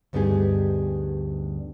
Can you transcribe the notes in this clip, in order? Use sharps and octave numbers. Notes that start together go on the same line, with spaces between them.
D2 G2 B3 D#4 G4 G#4